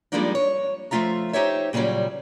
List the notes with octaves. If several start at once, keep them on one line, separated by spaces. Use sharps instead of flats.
F3 G3 G#3 A#3 D4 D#4
C#5
F3 F#3 A3 F4 E5 A#5
D#4 G4 C5 C#5 E5
A#2 C#3 E3 F#3 G3